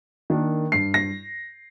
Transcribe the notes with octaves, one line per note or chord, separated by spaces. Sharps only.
D#3 A#3 D4
G2 C7
A#6